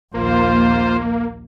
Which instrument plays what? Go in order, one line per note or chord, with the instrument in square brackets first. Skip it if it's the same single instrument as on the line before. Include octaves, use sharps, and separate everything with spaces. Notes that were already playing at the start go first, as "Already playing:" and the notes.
[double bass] A#1 D#2 [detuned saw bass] A#3 [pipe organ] F4 C5